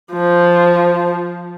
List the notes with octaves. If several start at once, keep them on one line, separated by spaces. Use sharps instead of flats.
F3